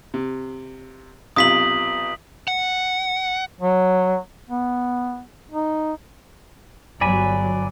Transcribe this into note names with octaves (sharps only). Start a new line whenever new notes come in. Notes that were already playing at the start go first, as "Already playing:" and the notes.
C3
B1 C3 F4 D#6 B6 F#7
F#5
F#3
B3
D#4
G1 F#3 D5 G#5 B5